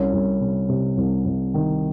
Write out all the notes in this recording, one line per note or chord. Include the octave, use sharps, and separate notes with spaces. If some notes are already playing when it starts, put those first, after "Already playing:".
Already playing: C2 C#4
C2
C3
C3
C2
C2
D#3